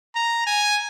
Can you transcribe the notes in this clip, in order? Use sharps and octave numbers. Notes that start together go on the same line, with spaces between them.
A#5
G#5